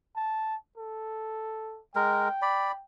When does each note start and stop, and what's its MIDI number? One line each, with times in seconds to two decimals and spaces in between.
0.16 0.56 81
0.77 1.80 69
1.96 2.28 56
1.96 2.28 70
1.96 2.84 79
2.42 2.72 74
2.42 2.72 83